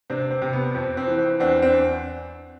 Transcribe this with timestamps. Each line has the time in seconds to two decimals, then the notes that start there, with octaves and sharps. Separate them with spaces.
0.10 C3 C4 D4
0.31 C4
0.42 C3
0.53 B3
0.74 F2 C4
0.97 C4
1.07 E3
1.19 C4
1.40 E2 C4 D4
1.62 C4 D4